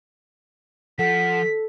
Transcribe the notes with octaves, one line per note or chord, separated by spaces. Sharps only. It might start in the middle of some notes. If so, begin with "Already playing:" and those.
F3 A4 F#5 B6